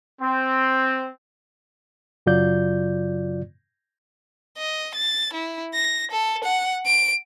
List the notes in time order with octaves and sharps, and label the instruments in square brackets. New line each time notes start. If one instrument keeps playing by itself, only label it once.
[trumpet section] C4
[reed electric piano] F#2 C#3 F#3 F4 D5 G6
[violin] D#5
A6
E4
A#6
A4
F#5
D7